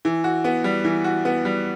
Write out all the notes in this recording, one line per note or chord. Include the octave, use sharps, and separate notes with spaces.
E3
F#4
B3
G3
E3
F#4
B3
G3